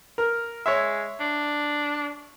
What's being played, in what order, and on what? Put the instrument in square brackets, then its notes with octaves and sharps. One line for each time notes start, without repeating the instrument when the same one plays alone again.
[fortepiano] A#4
[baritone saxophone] G#3 [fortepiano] C#5 E5
[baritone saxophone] D4